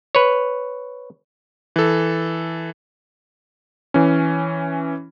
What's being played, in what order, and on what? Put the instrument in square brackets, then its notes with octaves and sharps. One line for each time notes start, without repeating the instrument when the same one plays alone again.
[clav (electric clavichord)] B4 C#5
[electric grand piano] E3 A4
E3 C#4